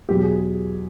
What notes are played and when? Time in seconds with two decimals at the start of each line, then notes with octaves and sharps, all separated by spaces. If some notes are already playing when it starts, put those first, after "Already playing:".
0.09 E2 B2 F#3 G4
0.23 G#4